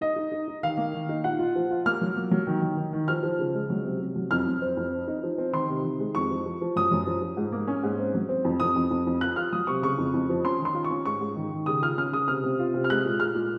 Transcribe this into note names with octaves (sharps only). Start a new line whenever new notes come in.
D#4 D#5
D#4
D#4
D#4
D#3 F5
A#3
D#3
D#4
A#2 F#5
F4
F3
F4
A#3 F6
F#3
A#3
F#3
D#3
D#3
D#3
D#3
F3 F6
F3
C#3
G#3
F#3
C3
C3
F#3
F2 F6
F2
C4
F2
C4
D#4
F3
C4
D#3 C6
C3
D#3
G#3
F2 C#6
F3
F3
F3
F#2 D#6
F#2
F3
F3
G#2
A#3
C#4
G#2
C4
F#3
C4
F2
F2 D#6
F2
F2
F2
F4 F#6
F4 F6
F#3 D#6
C3 C#6
C#3 C#6
F2
F2
F3
C#4 C6
D#3
C6
F4
C#6
C#4
G#2 C#6
G#2
D#3
D#3
C#3 D#6
F4 F6
C#4 F6
C#3 D#6
C3 F6
C3
F4
C3
F6
G#3 F#6
A#2
G#3 F6
A#2